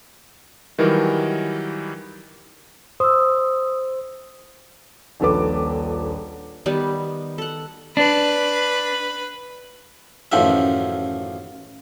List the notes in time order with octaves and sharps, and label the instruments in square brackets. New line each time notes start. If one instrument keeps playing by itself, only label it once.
[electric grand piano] D#3 E3 F#3 G3 A#4
[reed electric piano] C5 [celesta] D#6 E6
[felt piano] D#1 A#1 A4 B4 D6
[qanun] D#3 G3 B3
A4 F#5
[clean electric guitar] D4 [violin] B4
[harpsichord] A1 F#2 D#3 F3 E5